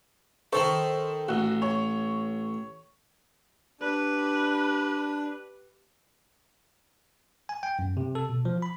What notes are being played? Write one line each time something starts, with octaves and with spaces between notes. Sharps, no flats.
D#3 A4 C5 C#6
A1 F#4
C#5
D4 G4 B4
G#5
G5
F#2
C3
A4
B2
F3
B5